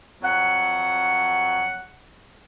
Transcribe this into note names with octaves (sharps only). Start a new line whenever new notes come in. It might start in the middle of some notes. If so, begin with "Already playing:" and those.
F2 F#3 F#5